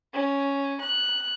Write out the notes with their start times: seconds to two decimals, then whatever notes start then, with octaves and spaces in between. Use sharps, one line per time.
0.14 C#4
0.80 F#6